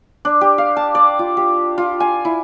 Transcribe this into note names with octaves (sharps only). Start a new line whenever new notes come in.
D4
G4
F5
A5
D5
F4
G4
F4
G#5
E4